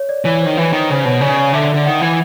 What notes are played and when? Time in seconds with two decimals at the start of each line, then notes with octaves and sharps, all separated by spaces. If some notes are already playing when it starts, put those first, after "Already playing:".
Already playing: C#5
0.09 D5
0.25 E3 C#5
0.42 D#3 C5
0.57 E3 B4
0.73 D#3
0.79 C5
0.90 C#3 C5
1.00 B2 C#5
1.21 C#3 D5
1.53 D3 E5
1.74 D3
1.86 D#3 F#5
2.01 E3